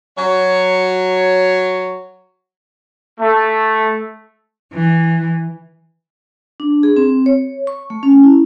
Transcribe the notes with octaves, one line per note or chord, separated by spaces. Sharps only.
F#3 C#5
A3
E3
D4
G#4
C4
C#5
C#6
A3
C#4
E4